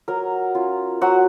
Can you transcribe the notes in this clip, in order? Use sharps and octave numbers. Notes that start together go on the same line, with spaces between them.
F#3 A#4
C#4 F4
F#3 F#4